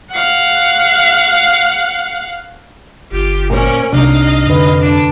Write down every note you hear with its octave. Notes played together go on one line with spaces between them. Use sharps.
F5 F#5
G1 F4 G4
A#2 C#4 A#4 C5
C2 C3 D4 D#4 D#5 F5
F2 D3 B4
D4